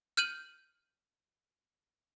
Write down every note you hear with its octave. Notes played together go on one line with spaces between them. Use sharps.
F6 G6 D#7 F#7